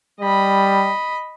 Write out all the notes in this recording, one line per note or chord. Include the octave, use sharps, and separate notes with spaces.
G3 D#5 B5